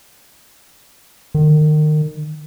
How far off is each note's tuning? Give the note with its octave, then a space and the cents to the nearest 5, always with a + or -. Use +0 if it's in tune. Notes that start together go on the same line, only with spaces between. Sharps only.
D#3 -30